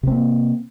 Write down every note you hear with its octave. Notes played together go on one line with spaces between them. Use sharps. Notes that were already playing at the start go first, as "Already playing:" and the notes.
C3 A#3 C4